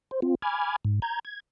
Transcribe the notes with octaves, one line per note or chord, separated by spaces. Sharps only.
C5
C4 F4
G#5 B5 D6 F6 G#6
G#2
A#5 G6 G#6
G#6